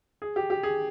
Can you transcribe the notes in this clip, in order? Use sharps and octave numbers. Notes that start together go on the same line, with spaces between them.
G#4
G4
G4
G#4